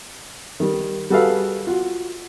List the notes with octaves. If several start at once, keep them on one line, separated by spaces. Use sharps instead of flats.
D#3 G3
G3 F#4 G#4 A4 B4 F5
F4 F#4